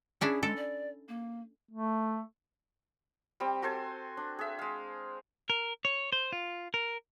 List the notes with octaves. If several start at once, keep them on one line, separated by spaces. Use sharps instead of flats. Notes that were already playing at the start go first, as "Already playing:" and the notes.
C#4 D4 E4 G#4
G#3 A4
D5
A#3
A3
G3 C4 G4
F#4 A4 C5 G#5
D4
G#4 E5
G#3 F5
A#4
C#5
C5
F4
A#4